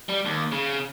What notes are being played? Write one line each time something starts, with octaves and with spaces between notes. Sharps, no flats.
G3
D#2
C#3